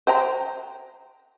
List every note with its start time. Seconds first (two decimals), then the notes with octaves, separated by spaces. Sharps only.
0.07 C5 G5 A#5